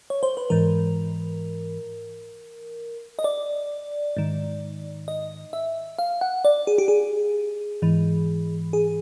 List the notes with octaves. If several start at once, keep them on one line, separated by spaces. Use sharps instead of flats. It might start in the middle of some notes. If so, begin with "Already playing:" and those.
C#5
C5
B4
G#2 E3 A#4
D#5
D5
G#2 D#3
D#5
E5
F5
F#5
D5
G#4
G4
G#4
G#2 E3
G#4